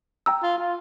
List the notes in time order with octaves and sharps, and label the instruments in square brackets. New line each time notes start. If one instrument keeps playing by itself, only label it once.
[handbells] G5 A#5 E6
[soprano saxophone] F4
F4